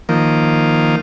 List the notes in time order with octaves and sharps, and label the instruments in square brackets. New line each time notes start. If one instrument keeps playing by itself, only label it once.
[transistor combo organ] D#3 F3 A#3